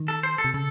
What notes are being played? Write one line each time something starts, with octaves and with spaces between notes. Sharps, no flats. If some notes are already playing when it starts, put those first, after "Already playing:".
Already playing: D#3
A4
C5
A4
C3
C#3 A4